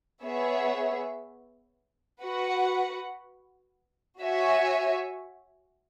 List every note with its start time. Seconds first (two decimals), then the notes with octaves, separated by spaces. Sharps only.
0.23 B3 G#4 C#5 E5
2.22 F#4 B4 F#5
4.20 F#4 C#5 E5 G#5